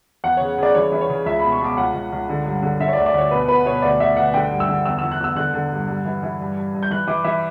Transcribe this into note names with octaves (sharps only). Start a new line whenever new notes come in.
E2 F#5
C#3 C#5
C#3 D5
E3 C#5
E3
C#5
C#3
C#2 E5
B5
B2
C#6
B2 D6
C#2 F#5
C#2
C#2
D3
G2
D3
D3 E5
C#5
D5
D2
D5
D2 C#5
B2 B4
B2 B4
B2 C#5
D2 D5
D2 E5
D2 F#5
D3 G5
G2
E6
D3
E2 E6
E6
E2
F#6
E2 E6
D3 F#6
D3
G2
G2
E3
E3
G2
G2
G2
G6
E3 F#6
E3 D6
E3 E5